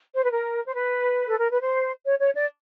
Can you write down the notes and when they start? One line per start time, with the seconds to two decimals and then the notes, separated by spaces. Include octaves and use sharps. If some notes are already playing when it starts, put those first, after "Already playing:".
0.15 C5
0.24 B4
0.32 A#4
0.66 C5
0.75 B4
1.27 A4
1.39 A#4
1.50 B4
1.62 C5
2.05 C#5
2.20 C#5
2.35 D5